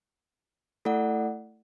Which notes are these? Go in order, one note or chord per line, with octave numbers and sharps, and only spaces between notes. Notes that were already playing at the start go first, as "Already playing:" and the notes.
A3 E4 A4 D5 F#5